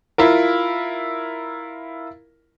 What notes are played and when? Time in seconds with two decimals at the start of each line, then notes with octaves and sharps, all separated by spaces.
0.18 E4 F4 A#4